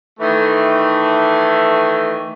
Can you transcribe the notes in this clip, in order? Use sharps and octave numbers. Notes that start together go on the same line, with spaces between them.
D#3 E3 A3